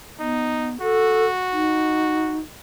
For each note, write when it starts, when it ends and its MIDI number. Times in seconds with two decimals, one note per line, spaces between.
0.19 0.81 59
0.19 0.72 63
0.81 2.42 66
0.81 1.26 69
1.52 2.38 63